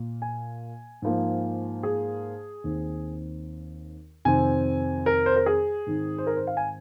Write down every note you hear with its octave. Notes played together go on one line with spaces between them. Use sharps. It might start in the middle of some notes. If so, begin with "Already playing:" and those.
Already playing: A#2 A#3
G#5
G#2 F3 A#3
G#4
D#2 D#3 C4
F2 C3 D#3 C4 G#5
A#4
C5
A#4
G#4
G#2 D#3 C4
C5
A#4
C5
F5
G#5